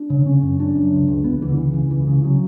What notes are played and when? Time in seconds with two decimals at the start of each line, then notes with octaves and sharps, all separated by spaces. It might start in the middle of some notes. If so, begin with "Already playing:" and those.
Already playing: D4
0.10 C#3
0.25 C#3 C#4
0.42 F#2
0.59 C#3 D4
0.76 F#2
0.93 C#2
1.08 C#2
1.24 C#2 B3
1.42 C#2 E3
1.49 D3
1.57 C#2 E3
1.74 C#3
1.90 C#2 E3
2.07 C#3
2.24 C#3 F#3